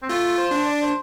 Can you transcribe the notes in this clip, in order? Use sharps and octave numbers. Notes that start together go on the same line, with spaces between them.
C4
A3 F4
C5
D4
D5
C5